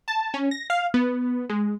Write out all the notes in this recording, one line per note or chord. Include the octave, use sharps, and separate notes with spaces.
A5
C#4
A#6
F5
B3
G#3